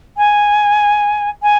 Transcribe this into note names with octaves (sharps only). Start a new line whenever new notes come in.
G#5
G#5